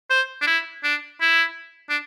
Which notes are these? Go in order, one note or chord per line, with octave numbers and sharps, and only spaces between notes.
C5
D4
E4
D4
E4
D4